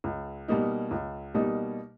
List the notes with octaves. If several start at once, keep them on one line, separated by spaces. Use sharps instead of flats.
C#2
B2 G3 A#3 D#4
C#2
B2 G3 A#3 D#4